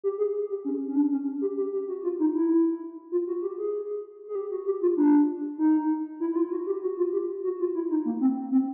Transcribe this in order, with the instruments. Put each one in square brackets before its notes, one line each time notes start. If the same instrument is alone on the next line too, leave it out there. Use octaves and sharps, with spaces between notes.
[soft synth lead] G4
G#4
G4
C#4
C#4
D4
C#4
G4
G4
G4
F#4
F4
D#4
E4
F4
F#4
G4
G#4
G#4
G4
F#4
G4
F4
D4
D#4
E4
E4
F4
F#4
G4
F#4
F4
G4
F#4
F4
E4
D#4
A#3
C4
C4